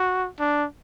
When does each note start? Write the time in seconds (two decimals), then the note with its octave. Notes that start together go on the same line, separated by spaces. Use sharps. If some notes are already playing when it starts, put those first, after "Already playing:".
Already playing: F#4
0.39 D4